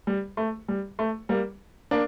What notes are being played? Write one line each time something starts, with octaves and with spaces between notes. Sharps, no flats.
G3
A3
G3
A3
G3 A#3
A#3 D4